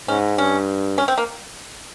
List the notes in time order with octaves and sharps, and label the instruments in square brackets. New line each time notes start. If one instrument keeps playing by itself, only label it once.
[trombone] G#2 [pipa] C#4
[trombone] G2 [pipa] C#4
[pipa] C#4
C4
A#3